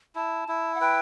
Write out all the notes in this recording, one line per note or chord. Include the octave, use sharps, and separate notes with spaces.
E4 A5
E4
F#5
B4 G5